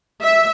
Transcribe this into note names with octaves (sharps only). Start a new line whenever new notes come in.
E5